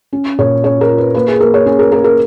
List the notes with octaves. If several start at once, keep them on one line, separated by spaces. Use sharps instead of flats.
C#4
A#2 C#5
C#4 C#5
A#4
F4
B4
A#3 B4
G#4
A#3 A#4
C#5
C#4 G#4
A#4
A#3 A#4
A#4